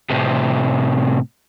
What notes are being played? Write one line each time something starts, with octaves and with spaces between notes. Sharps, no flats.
A2 C3